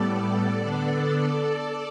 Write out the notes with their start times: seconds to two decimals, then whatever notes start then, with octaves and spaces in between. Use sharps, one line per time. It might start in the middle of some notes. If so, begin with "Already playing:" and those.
Already playing: A2 G3 B3 A4 D5
0.58 D3 B3 D4